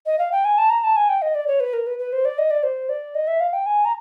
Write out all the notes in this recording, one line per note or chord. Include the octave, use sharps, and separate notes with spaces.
D#5
F5
G5
G#5
A5
A#5
A5
G#5
G5
D#5
D5
C#5
B4
A#4
B4
B4
C5
D5
D#5
D5
C5
D5
D#5
E5
F5
G5
G#5
A#5